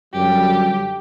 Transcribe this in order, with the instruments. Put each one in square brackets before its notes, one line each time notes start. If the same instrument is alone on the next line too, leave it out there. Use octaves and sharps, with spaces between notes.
[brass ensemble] F#2 D3 G3 [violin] G4